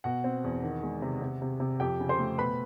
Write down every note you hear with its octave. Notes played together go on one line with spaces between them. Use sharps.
B2 F#4 F#5
C4
E2
D#3
G#3
C3
C3
C3
C3
F2 G4 G5
C#3
C5 C6
A3
B2 B4 B5